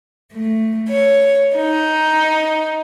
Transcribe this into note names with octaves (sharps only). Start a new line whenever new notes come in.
A3
C#5
D#4